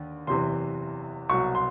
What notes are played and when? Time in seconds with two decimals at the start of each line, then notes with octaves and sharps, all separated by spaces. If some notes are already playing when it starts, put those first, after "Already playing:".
Already playing: D#2 D3
0.27 F#1 E2 C3 E3 C6
1.29 C2 B2 F#3 C#6
1.55 C6